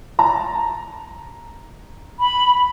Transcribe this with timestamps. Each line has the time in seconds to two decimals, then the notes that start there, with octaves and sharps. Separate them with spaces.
0.19 A5 A#5
2.20 B5